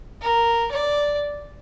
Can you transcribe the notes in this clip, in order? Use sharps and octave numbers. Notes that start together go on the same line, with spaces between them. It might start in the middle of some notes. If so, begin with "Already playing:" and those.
A#4
D5